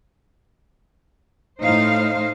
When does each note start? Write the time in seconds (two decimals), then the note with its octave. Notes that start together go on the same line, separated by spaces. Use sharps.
1.63 A2 D#4 C5 F5